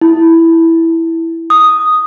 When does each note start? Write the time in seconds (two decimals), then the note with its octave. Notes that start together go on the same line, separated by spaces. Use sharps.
0.01 E4
1.50 D#6